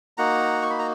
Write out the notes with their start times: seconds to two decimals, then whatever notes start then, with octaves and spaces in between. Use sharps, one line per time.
0.18 A#3 D#4 F#4 F#5 A#5
0.62 C#6
0.70 B5
0.79 A#5